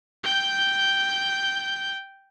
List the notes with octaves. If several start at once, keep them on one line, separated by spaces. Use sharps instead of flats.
G5 G6